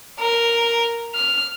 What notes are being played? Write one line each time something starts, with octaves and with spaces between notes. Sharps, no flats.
A#4
F6